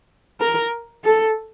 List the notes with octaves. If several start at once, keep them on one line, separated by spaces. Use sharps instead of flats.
A#4
A4